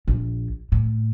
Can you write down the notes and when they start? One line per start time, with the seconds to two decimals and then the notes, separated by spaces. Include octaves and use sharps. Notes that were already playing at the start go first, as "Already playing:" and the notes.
0.08 A#1
0.72 A2